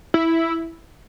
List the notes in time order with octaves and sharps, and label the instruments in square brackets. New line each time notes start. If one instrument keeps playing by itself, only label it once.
[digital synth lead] E4